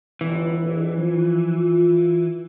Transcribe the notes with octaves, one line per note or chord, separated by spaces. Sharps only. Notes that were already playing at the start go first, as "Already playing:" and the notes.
G1 E3
A#1 F2
F3
F4